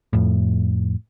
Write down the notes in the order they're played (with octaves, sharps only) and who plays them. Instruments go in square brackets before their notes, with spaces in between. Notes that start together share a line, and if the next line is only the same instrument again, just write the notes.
[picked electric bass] F2 A2